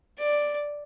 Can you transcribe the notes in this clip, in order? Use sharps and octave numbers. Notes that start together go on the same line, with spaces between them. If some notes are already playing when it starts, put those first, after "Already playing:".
D5